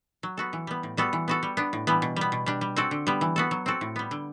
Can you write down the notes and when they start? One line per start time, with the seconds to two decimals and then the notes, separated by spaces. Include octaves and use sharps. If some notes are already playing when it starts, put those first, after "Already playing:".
0.23 F#3
0.37 B3 F#4 A4
0.53 E3
0.67 G3 B3
0.83 A2
0.97 G3 B3 F#4 A4
1.13 E3
1.28 B3 F#4 A4
1.43 G3
1.57 B3 D4
1.73 A2
1.87 E3 G3 B3
2.02 B2
2.16 G3 B3
2.32 B2
2.46 G3 D4
2.61 G3
2.76 C4 F#4 A4
2.91 D3
3.07 G3 B3
3.21 E3
3.36 B3 F#4 A4
3.51 F#3
3.66 C4 F#4 A4
3.81 A2
3.96 G3 B3
4.11 D3